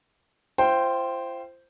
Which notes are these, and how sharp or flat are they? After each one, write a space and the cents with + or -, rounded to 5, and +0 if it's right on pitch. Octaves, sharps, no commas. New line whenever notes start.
F4 -40 C5 +0 G5 -10